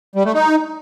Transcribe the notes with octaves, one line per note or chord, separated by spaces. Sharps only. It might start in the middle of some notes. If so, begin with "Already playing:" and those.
G3
A3
D#4